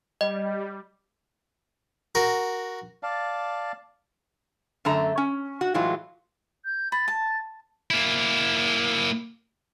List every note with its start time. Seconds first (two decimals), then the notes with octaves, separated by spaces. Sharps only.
0.21 G3 D#5
2.15 F#4 A#4
3.03 D5 F5 A5
4.85 F#2 D3 A3 A#5
5.18 C#4
5.61 F#4
5.74 A2 E3 F#3 G#3 F4
6.65 G6
6.92 B5 A6
7.08 A5
7.90 A#3 E4